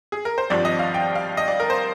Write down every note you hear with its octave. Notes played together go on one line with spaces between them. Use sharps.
G#4
A#4
C5
G#1 G2 F3 C4 D5
D#5
F5
G5
F5
D#5
D5
A#4
C5